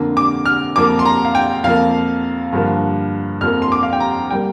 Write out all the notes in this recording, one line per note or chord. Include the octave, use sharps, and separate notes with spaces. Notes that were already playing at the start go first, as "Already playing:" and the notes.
Already playing: F2 D3 A#3
D6
F6
F2 F3 A#3 D6
C6
A#5
F5
G5
F2 F3 A#3 F5
G2 D3 F3 A#3
F2 F3 A#3 F6
C6
D6
F5
G5
A#5
G3 A#3 G5